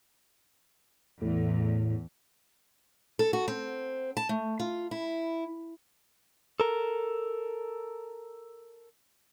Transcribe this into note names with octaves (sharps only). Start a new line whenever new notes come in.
E2 A2
A4
F#4
C4
A5
A3
F4
E4
A4 A#4